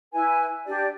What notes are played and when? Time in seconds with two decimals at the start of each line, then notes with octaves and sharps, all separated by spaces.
0.13 E4 B4 G#5
0.66 D4 G4 D5